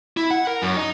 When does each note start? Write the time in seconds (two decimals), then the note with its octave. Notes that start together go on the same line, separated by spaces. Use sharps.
0.17 E4
0.31 F#5
0.47 A#4
0.62 F#2
0.77 D#4